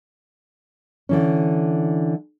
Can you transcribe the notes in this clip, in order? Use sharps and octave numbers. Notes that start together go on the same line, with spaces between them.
D3 E3 C#4